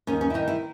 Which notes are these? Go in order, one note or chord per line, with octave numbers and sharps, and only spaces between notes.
D#2 C#4
C#4
E4
D#3 D#4
E4